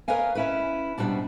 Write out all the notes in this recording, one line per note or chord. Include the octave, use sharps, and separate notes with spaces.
A#4 B4 C#5 D#5 F5 G#5
C#4 E4 B4
G#2 B2 F#3 G3 C#4 D4